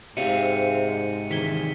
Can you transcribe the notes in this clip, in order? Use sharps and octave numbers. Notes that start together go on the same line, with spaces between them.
G#2 C3 D5 E5 F5 C#7 D#7
C3 D#3 E3 G#4 E5 B6 G7